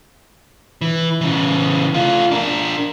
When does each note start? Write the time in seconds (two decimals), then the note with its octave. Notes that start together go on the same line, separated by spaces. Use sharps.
0.81 E3
1.21 C#3 E3
1.94 A3 F4
2.31 D4 A#4